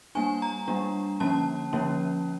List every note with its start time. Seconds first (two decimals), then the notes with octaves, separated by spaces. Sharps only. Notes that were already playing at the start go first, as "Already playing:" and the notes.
0.15 G3 A#3 D4 G#5
0.42 A#5
0.68 G3 A#3 D4
1.20 D3 F3 A#3 C#4 A5
1.73 D3 F3 A#3 C#4